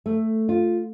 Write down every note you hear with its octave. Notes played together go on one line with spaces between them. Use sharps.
A3
F4